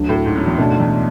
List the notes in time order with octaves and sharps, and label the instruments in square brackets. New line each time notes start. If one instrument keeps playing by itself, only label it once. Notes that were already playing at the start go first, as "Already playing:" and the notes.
Already playing: [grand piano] D2 D3 F#3
[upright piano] A2
G#2
F#2
E2
[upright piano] F#2 [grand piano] B2 A3 D4 A4
[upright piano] G#2
E2